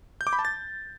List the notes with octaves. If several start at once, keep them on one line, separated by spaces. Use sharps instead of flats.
G6
D6
B5
A5
A6